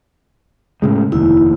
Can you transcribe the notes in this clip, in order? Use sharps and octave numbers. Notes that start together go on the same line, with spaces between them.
A2 C#3 G#3
F1 D#2 E4